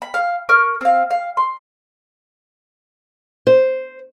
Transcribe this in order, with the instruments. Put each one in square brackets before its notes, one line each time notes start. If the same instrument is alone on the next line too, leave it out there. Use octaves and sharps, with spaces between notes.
[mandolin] B5
F5
A#4 C#6 F6
C4 F5
F5
C6
[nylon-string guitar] C5